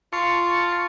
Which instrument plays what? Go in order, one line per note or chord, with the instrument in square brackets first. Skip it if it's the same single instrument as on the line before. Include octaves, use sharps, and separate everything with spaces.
[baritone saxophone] F4 [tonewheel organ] A5 C#6